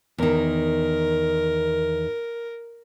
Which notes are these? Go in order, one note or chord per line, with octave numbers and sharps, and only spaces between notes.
E2 D#3 A#4